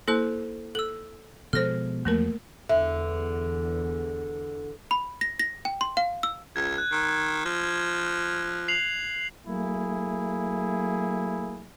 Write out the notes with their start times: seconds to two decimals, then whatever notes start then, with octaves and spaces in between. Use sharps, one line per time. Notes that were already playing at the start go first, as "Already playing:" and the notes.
0.08 A#3 E4 A4 C5 F#6
0.75 A4 E6 F#7
1.53 B2 F3 G#3 A4 C5 F6 A#6
2.05 E2 F3 F#3 A3 A#3 A#4
2.69 E2 D3 E5
4.91 B5
5.21 A#6
5.39 A#6
5.65 G5
5.81 C6
5.97 F5
6.23 E6
6.56 C#2 G#6
6.78 F#6
6.92 D#3
7.45 F3
8.68 C7 F7 F#7
9.47 F#3 A3 A#3 E4 G#4